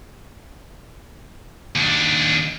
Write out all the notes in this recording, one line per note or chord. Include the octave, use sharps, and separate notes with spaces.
D#2 D4